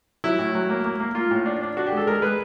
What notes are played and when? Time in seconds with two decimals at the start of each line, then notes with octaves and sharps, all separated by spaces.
0.24 F#3 E4
0.39 A2
0.55 F#3
0.70 A#3
0.84 A#3
1.00 A#3
1.15 A#3 F4
1.31 A2
1.46 D4
1.61 D4
1.77 D4 F#4
1.87 G4
1.92 G#3 A4
2.07 G#3 A#4
2.22 G#3 B4